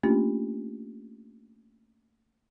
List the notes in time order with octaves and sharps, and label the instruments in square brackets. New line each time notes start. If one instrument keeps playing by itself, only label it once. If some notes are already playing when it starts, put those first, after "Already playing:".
[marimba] A3 A#3 C#4 D4 F4 G4